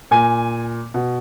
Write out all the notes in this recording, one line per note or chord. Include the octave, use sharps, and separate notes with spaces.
A#2 G#5
B2